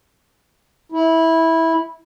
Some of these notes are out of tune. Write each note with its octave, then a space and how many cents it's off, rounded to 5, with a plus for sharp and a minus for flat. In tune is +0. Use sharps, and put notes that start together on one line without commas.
E4 -15